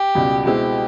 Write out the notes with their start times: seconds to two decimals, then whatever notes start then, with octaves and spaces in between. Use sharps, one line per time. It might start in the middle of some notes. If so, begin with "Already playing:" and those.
Already playing: G4
0.15 C#2 B2 G3
0.45 B2 G#3 C4 E4 G4